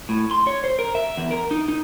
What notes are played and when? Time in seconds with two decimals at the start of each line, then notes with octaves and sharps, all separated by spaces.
0.09 A2
0.31 C6
0.47 C#5
0.64 C5
0.79 A#4
0.95 E5
1.17 E2
1.31 A#4
1.51 D#4
1.68 D#4